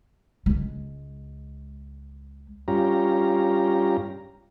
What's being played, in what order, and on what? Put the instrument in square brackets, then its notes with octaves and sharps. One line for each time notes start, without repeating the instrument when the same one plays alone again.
[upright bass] C#2 G#3
[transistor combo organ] G2 C#4 F4 G4 A#5